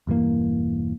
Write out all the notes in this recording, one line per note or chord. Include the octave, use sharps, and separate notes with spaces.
E1 G2 E3 A#3